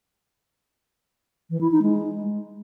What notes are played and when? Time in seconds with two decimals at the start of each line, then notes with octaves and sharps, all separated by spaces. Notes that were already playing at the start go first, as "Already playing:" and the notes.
1.50 E3
1.61 E4
1.71 D#4
1.82 G#3